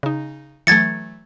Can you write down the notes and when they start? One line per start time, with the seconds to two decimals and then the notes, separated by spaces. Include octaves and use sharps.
0.03 C#3 D#4
0.67 E3 F#3 A3 G#6 A6 C#7